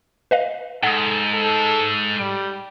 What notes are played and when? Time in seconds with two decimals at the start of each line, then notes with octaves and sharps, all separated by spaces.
0.31 B4 D#5 F5
0.83 G#2 A4 F#5 D#6
1.33 A4
2.19 G3 D7